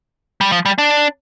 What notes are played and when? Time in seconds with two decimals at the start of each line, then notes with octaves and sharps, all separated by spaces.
0.41 G3
0.52 F3
0.65 G3
0.78 D4